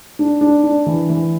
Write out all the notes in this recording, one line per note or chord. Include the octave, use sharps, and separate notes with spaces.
D4
D4
D4
E3
E3